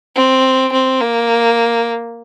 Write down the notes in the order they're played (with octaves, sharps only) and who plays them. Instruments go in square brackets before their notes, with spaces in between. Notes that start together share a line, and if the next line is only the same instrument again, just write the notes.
[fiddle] C4
C4
A#3